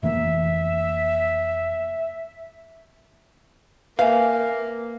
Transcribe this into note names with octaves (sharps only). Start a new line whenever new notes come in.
F1 E3 A#3 E5
A#3 B4 E5 F5 G#5